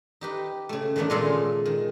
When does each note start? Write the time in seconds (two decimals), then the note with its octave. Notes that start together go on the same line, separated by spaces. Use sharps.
0.21 D#4 G4 B4
0.69 C#3 A3
0.96 D#3 E3 A3 B3 D4
1.10 A#2 C#3 G#3 G#4 A4 F5
1.66 D#3